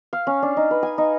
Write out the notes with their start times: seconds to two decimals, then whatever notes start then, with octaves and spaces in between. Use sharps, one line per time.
0.13 F5
0.27 C#4
0.43 D4
0.57 D#4
0.71 B4
0.83 G#5
0.98 D#4